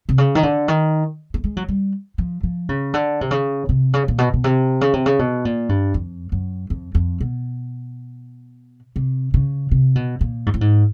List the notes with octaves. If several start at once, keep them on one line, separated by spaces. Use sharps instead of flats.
C3
C#3
D#3
D3
D#3
A3
G#3
F#3
G3
F3
F3
C#3
D3
C3
C#3
C3
C#3
A#2
B2
B2
C3
C#3
C3
C#3
B2
A#2
G2
F2
F#2
F2
F2
B2
C3
C#3
C3
B2
A#2
G#2
A2
G#2